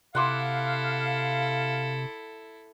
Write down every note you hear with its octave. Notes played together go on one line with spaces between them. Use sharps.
C3 E4 A4 F5 F#5 C6 D6